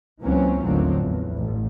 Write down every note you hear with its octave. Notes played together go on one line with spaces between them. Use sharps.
C#2 E3 F#3 A#3 C4 C#4
A1 D#2 D3 F3 F#3 C4
E2
A1